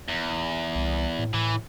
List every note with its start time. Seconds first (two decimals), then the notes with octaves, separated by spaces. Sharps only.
0.08 E2
0.75 C2
1.19 A2
1.34 A2 E3